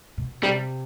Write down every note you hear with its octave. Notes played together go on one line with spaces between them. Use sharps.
B2
C3 G3